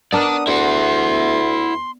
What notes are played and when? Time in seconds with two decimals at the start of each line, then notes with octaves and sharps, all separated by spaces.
0.12 B3 D4 A#4 D5 A5 D#6
0.47 D2 E4 F#5 C6